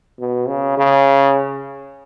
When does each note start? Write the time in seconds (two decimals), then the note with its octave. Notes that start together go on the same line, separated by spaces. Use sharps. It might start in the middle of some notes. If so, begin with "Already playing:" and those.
0.19 B2
0.48 C#3
0.78 C#3